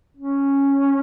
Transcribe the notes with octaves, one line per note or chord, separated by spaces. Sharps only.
C#4